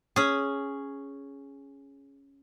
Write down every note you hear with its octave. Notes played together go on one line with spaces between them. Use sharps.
C#4 G#4